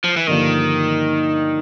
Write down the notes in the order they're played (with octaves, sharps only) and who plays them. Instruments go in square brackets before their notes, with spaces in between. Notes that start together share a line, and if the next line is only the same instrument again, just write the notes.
[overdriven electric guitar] F3
E3
[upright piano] G2 D3 F3 A#3 [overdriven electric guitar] D#3